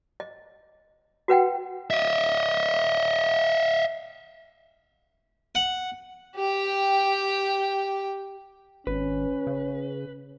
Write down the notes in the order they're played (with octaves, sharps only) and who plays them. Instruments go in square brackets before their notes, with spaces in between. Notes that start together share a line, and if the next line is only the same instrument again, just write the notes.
[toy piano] D#5
F#4 B4 F#5 G5
[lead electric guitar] D#5 E5
[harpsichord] F#5
[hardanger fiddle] G4 G5
[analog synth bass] G#1 [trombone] C#4 [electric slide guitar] B4
[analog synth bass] C#3